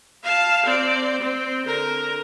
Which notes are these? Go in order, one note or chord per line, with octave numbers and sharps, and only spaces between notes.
F5 A5
C4 D5
C4
D3 A#4